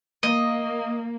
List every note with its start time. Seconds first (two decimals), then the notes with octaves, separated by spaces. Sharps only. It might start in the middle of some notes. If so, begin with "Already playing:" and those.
0.23 A#3 D#5